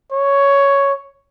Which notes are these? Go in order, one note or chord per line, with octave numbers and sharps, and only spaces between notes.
C#5